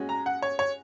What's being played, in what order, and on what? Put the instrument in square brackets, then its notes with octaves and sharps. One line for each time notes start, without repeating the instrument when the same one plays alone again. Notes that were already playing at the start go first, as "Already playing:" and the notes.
Already playing: [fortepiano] G#3 C#4 F#4
[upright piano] A#5
F#5
C#5
C#5